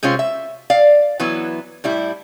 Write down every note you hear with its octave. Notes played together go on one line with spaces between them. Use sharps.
C3 G#3 C4 C#4 F4
E5
D5 F5
E3 F#3 B3 E4
A2 G3 E4